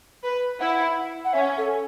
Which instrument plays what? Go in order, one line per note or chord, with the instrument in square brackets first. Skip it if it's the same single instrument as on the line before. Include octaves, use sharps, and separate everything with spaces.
[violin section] B4
[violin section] E4 [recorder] F#5
[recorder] F#5
[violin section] C#4 [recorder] E5
[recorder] A4